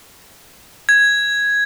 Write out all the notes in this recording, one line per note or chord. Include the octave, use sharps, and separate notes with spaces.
G#6